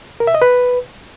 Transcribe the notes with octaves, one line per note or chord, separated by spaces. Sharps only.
A#4
E5
D#5
B4